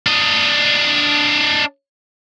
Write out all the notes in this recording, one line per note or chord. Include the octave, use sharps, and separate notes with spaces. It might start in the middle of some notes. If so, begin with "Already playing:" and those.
D4 D#5